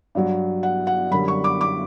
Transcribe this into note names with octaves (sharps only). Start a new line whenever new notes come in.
G2 F#3
F#5
F#5
F#2 D3 G3 B5
C#6
D6
D6